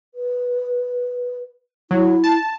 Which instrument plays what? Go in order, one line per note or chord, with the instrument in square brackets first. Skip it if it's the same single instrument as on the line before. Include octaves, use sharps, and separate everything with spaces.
[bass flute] B4
[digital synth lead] F#3 [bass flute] E4
[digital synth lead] A5